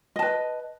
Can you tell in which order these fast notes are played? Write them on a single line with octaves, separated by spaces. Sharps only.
D#5 A5 B4